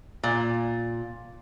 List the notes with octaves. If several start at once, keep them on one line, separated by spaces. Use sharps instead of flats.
A#2